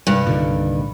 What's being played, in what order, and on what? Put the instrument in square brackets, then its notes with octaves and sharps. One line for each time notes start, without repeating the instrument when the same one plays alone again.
[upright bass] C2 G3 [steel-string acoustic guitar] G2
[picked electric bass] A#2 D3 D#3